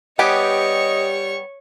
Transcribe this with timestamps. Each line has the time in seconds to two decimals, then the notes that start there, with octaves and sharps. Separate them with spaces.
0.19 G3 B3 G4 C#5 D#5 G#5 C#6